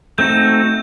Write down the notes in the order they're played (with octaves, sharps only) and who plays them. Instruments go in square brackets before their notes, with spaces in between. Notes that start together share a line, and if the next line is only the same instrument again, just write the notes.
[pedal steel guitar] A3 C4 D#4 F#4 [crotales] G6